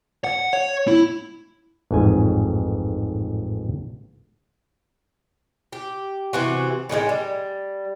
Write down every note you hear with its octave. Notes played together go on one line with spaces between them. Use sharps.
F#5
C#5
E4
A1 F2 G#2 G#5
G4
C3 E3 F#4
A2 D#3 E3 G#3
G3